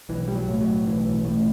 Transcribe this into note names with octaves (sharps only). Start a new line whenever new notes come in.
B1 E3
G3
F#3
A2
F#3
B1 E3
A2